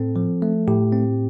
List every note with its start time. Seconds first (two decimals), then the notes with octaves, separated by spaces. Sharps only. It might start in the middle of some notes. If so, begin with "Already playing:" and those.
Already playing: A2 C4 A4
0.16 F3
0.42 A3
0.67 A2 G4
0.92 C4